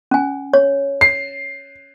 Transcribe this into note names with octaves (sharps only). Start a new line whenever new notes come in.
C#4 G#5
C#5
C7